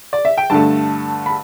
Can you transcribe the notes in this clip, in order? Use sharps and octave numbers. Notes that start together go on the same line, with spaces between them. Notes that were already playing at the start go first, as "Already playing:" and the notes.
D5
E5
G5
G2 D3 A3 A5
B5